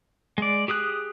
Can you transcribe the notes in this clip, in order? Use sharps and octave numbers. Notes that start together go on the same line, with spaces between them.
G#3 D5
G4 G#4 D#6 F#6